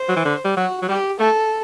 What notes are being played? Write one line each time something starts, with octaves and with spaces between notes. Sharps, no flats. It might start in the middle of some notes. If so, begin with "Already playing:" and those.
Already playing: C5
F#3
E3
D3
G3
F#3 F#4
F#3
G3 G4
A3 A4